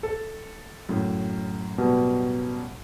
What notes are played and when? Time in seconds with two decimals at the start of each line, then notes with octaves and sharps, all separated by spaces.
0.03 A4
0.89 F#2 A2
1.78 B2 G3